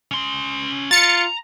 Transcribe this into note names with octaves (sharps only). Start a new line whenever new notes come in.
C#4 C6
F4 A#5 A6 C#7